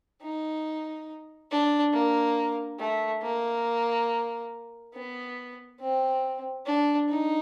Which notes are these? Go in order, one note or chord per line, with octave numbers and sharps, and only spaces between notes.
D#4
D4
A#3
A3
A#3
B3
C4
D4
D#4